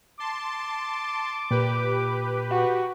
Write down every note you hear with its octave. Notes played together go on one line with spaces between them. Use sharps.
A5 C6 D6
A#2 G4 B4
F#4